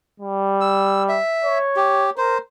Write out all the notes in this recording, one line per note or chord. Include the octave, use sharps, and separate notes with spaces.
G3
E6
E5
C#5
G4
A#4 C5